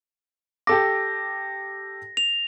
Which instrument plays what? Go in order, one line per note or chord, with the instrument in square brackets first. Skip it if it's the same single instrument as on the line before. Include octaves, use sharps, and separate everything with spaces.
[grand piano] G4 A4 D6 [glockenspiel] A#6
[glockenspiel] F7